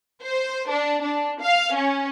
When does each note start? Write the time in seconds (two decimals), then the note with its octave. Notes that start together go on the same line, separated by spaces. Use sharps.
0.23 C5
0.68 D4
1.02 D4
1.41 F5
1.75 C#4